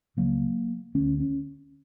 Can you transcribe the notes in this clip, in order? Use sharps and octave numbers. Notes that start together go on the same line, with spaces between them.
C#2 C#3 F#3 A#3
D2 D3 A#3 C#4
C#4